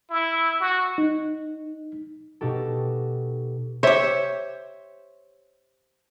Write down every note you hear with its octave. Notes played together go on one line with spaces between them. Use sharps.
E4
F#4
D#4
B2 D#4 F#4 G4 A4
G4 C5 C#5 E5